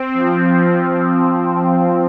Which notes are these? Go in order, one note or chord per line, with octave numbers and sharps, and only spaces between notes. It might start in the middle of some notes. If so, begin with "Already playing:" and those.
Already playing: C4
F3